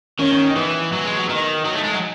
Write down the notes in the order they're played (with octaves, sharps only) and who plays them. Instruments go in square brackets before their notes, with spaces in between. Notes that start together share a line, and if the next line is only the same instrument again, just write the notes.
[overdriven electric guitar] D#3 [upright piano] C#4
[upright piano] C#4
D#4
[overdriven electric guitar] E3 [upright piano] B3
[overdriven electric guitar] F#3
G#3
F#3
[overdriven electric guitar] D#3 [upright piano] D#4
[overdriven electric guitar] F#3
A3
G#3
F#3